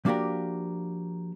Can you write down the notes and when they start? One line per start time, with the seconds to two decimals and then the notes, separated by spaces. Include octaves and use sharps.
0.05 F3 A#3 D4 F#4 G4 A#4